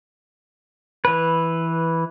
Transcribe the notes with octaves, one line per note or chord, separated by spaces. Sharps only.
E3 B4